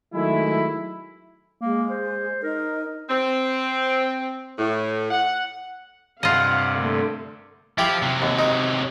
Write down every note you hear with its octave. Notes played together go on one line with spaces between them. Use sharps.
D#3 F#3 G#3 A3 E4
G#3 A#3
C5
D#4 A#4
C4
A2
F#5
G2 C3 F4 D#5 F5 F#5
D3 A3 A#3
F3 E4 G4 G5
C3 F#3
D#2
D#4